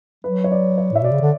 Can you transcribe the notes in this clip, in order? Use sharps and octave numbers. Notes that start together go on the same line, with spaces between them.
F#3 B4
C#5
D5
C#5
A2 E5
B2 D5
C#3
D3